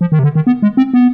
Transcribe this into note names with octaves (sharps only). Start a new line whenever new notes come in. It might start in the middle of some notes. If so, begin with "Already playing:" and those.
F3
D#3
C3
D3
D#3
B3
G#3
C4
B3